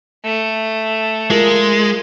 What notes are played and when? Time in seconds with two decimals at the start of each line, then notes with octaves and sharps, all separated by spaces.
0.25 A3
1.31 G#3 F4 A#4